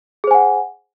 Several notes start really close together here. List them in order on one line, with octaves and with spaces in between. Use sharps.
G#4 C5 G#5 F#5